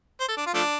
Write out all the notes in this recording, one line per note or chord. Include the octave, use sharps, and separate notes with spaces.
C5
A4
D4
F4
F3 A3 D4